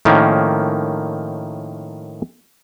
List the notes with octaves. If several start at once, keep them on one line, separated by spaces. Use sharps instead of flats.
A2 D#3 F3 A#3 C#4